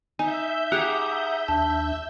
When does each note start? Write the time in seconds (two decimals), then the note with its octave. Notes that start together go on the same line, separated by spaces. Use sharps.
0.19 D#4 E5 G#5 G6
0.72 G4 G#4 F#5 A#5 D#6 F#6
1.48 D#2 D4 A5